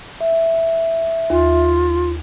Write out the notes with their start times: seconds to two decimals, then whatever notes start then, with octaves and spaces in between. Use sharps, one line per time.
0.21 E5
1.30 D#2 F4